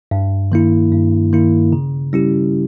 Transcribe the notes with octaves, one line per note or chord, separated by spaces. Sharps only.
G2
D#3 A#3 E4
G2
D#3 A#3 E4
C#3
G3 C#4 E4 G4